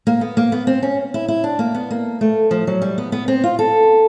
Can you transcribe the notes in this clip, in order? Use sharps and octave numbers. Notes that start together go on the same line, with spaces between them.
A#3
B3
A#3
B3
C4
C#4
E4
E4
D4
A#3
B3
A#3
A3
F3
F#3
G3
B3
B3
C4
F4
A4